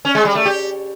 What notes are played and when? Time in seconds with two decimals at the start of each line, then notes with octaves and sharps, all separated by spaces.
0.05 C#4
0.15 G#3
0.25 G3
0.35 A3
0.45 G4